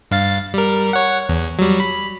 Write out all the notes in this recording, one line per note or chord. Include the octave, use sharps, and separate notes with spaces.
G2 F5 A6
G3 A#4
C#5 F#5
E2
F#3 G3
B5